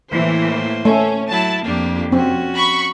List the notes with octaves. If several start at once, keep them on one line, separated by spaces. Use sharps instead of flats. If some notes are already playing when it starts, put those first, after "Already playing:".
A2 E3 A#3 C5
A3 C#4
F#3 E4 A5
F2 A#3 D4 G4
C4 C#4 F#4
B5 C#6